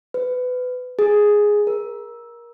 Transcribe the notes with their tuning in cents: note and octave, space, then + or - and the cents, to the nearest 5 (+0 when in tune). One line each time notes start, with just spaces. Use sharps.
B4 +25
G#4 +0
A#4 +20